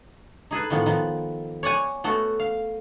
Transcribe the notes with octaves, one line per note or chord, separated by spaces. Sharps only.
D#4 G#4 A4 B4
A2 D#3 F3 B3
D#3 F3 B3
C#5 D5 F#5 G#5
A3 B3 F#4 A4
F5